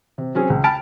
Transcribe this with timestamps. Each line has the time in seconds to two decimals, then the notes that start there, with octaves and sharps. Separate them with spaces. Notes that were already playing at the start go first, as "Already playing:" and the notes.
0.18 C3
0.35 F#3 C4 C#4 G#4
0.50 C#2
0.64 G5 A5 B5 F6 A6 D7